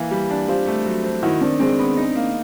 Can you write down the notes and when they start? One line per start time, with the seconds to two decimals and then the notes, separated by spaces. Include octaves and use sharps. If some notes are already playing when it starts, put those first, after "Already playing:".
Already playing: E3 A#3
0.11 G3
0.30 D4
0.48 C4 F4 G4
0.67 A3
0.86 F#3
1.04 C4
1.23 D#3 E4 F#4
1.41 D#3 C4 D4
1.59 G#3 C4 D4
1.79 B3
1.97 D#4
2.16 A#3